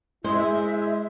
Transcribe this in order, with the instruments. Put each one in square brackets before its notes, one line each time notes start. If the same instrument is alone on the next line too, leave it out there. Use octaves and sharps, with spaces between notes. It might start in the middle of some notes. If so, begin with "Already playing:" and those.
[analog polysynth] G#3 [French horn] E4 [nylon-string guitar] C5 [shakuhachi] E5